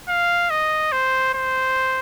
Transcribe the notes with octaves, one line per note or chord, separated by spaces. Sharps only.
F5
D#5
C5
C5